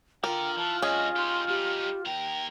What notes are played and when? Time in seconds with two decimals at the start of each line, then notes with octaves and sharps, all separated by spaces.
0.24 D3 F4 A#4 D5 G5
0.57 E3 A5
0.82 G2 C#4 F#4 G#4 D#5
1.16 D#4 G4 C6
1.48 G3 D#4 G4
2.06 D#2 A#4 G5